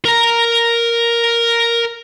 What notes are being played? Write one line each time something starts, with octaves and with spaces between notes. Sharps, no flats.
A#4 A#5